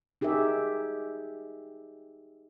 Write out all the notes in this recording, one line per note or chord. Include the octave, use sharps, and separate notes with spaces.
D#4 G4 G#4 A#4 E5